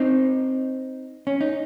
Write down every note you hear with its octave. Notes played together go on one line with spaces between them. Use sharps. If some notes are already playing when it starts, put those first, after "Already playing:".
Already playing: C4 D#4
C#4
D#4